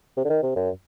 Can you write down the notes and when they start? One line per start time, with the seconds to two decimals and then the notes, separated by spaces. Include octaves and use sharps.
0.17 C3
0.25 D3
0.30 D#3
0.43 C3
0.56 F#2